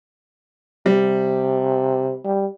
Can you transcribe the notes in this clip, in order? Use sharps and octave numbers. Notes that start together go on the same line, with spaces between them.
C3 G3
G3